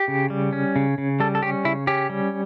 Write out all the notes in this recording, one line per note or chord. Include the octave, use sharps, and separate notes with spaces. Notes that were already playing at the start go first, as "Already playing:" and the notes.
Already playing: G4
C#3
G3
C#4
C#3
C#3
G3 A4
A4
C#4 G4
C#3 E4
C#4 G4
G3